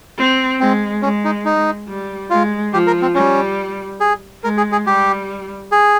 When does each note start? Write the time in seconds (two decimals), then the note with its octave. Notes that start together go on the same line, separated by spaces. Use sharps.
0.17 C4
0.60 G#3 C4
1.02 G#3 C#4
1.24 D#4
1.45 D#4
1.88 G3
2.30 G#3 F4
2.73 F3 G4
2.87 A#4
3.02 C4
3.15 G3 C#4
4.00 G#4
4.43 G#3 A#4
4.57 G#4
4.72 G#4
4.86 G3 G4
5.72 G#4